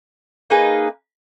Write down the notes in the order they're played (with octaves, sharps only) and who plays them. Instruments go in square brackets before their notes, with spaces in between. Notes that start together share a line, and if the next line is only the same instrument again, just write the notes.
[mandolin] A#3 D#4 G#4 B4